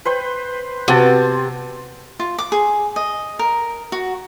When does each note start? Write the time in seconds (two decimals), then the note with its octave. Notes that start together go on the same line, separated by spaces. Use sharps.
0.05 B4 C5 G5
0.88 C3 B3 C4 F#4 A5
2.20 F4
2.38 D6
2.52 G#4
2.96 D#5
3.39 A#4
3.92 F#4